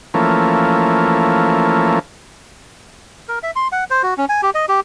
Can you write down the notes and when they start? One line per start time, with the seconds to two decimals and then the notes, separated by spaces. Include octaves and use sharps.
0.14 E3 F3 A3 A#3 C#4
3.29 A#4
3.43 E5
3.56 C6
3.72 F#5
3.90 C5
4.03 F#4
4.18 C#4
4.29 G#5
4.42 G4
4.55 D#5
4.69 G4